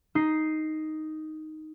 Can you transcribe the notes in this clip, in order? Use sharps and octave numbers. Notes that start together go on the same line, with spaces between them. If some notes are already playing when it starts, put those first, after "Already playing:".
D#4 C7